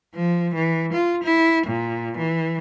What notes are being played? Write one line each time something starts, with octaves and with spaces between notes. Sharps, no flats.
F3
E3
F4
E4
A#2
E3